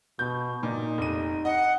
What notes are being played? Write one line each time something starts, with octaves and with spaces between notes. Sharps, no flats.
B2 G6
A#2 D#4
F1 D#7
D#5 F#5